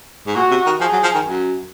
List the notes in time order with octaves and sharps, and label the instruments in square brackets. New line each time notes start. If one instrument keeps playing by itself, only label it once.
[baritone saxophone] G#2
[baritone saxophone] A#2 [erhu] F#4
[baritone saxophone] C3
D#3
[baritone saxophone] F3 [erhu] G#4
[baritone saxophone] F#3
F3
D#3
F#2